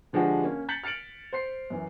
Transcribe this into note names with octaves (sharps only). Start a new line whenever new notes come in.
D3 F3 G#3 D4 F#4 G4
A#3 C#4
F#6 G6 A6 B6 C#7 F#7
F6 A6 C#7 D7 F#7
C5 C6 C7
F#2 E3